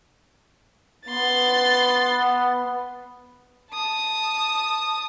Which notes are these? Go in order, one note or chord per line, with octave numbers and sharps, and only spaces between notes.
B3 C6 A6
A5 D#6